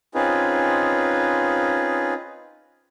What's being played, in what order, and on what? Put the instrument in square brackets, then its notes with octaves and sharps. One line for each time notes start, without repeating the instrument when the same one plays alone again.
[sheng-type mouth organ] C4 C#4 D#4 F4 G#4 B4